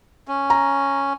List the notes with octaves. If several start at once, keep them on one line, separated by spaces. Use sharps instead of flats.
C#4
A#5